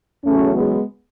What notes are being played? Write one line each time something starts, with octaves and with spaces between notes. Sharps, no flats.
E2 C#3 F#3 A3 C#4
G#3 B3